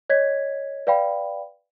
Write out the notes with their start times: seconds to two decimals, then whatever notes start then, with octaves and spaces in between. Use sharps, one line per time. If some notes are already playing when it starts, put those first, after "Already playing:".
0.10 C#5 D#5 G#6 B6
0.87 B4 D5 F5 G5 B5